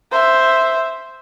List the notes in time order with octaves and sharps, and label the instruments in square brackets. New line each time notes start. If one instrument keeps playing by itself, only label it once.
[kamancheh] C5 E5